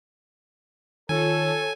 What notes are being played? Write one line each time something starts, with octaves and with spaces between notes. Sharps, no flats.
D#3 F4 A4 C#5 G#5